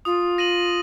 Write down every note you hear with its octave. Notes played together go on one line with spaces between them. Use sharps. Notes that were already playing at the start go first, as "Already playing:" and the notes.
F4 D#6
A#6 D#7 F#7